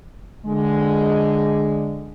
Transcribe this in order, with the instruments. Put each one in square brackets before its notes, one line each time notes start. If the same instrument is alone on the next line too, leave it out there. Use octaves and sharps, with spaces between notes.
[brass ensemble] D3 G#3